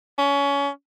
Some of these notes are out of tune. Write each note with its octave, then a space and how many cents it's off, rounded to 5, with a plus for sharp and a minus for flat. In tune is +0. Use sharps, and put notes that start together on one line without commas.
C#4 +25